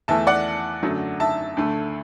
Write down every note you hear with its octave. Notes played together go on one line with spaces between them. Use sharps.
E2 E3 A3 E5 A5
D5 F#5
F#2 D3 F#3 A3
E5 A5
D2 D3 A3